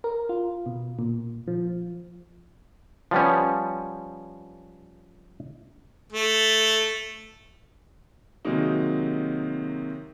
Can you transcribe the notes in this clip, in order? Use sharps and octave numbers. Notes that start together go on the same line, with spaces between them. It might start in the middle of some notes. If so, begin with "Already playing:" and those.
A#4
F4
B2
A#2
F3
F3 G3 B3 C#4
A3
C3 D#3 F#3 G#3 A#3 D#4